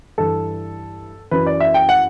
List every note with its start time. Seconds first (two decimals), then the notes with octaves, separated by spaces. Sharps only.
0.18 G2 E3 A4
1.31 F#2 E3 B4
1.46 D5
1.60 E5
1.74 G5
1.89 F#5